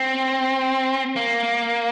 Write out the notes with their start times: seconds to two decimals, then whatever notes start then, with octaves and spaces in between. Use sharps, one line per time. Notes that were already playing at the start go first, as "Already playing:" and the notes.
Already playing: C4
1.16 A#3